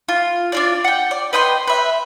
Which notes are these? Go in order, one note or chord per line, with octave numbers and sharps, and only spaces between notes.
F4
D4 F4 D5
F#5 G5
D5
B4 D#5 G5 C6
B4 E5